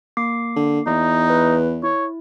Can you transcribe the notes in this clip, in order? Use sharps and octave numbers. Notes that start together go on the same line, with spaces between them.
A#3 D6 C7
D3
E2 D#4
B4
E4 C#5